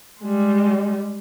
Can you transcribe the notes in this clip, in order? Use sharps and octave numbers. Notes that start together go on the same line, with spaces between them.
G3 G#3